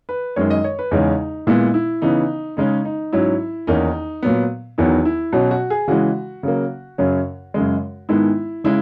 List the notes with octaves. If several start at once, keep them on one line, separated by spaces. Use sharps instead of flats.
B4
F#2 D#3 G#3 C#5
D#5
C#5
B4
E2 C#3 G#3 C#4 D#4
A#2 G#3 B3 E4
E4
C#3 E3 B3 D#4
C#3 G#3 C#4 D#4
D#4
G#2 F#3 C#4 E4
E2 D#3 A#3 C#4 D#4
A#2 F#3 B3
E2 D#3 F#3 B3 E4
E4
B2 F#3 C#4 F#4
F#4
G#4
C#3 E3 G#3 F#4
C#3 F#3 A#3
F#2 C#3 F#3 C#4
F#2 C#3 G#3
G#2 D#3 G#3 B3 E4
C#3 G#3 E4